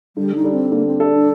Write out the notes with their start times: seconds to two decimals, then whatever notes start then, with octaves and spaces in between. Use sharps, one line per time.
0.16 D3 G3
0.35 D#4
0.44 G3 D4 A4
0.54 C4
0.72 D3 A#3
0.87 C4
1.00 G3 D4 A4
1.15 D4